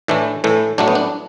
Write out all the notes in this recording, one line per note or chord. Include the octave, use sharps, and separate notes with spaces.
A2 E3 A3 D4
A2 E3 A3
A2 F#3 A3 D4
B3
D4